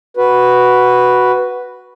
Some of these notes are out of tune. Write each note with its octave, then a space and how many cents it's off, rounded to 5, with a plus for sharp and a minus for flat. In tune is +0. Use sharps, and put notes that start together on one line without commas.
F#4 +0 B4 +0